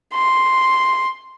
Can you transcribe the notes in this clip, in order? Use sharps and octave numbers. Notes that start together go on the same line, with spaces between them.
C6